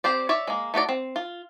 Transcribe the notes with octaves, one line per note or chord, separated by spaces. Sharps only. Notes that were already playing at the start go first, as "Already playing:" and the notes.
C4 G4 C5 D5
C#5 D5 E5
G#3 A#3
A3 D#4 F#4 D5
C4
F4